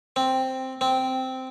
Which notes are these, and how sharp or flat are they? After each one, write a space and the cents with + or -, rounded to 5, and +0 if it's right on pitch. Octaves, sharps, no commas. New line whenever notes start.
C4 +0
C4 -10